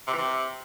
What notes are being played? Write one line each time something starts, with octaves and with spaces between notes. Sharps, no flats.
C3
E3
C3